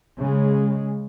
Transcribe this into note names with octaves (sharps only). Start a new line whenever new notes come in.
C#3 G#3